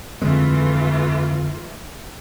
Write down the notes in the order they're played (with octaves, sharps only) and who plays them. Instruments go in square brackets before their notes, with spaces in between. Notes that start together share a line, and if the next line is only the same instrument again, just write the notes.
[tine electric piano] F2 D3 [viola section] E3 A3 F4 [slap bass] G#3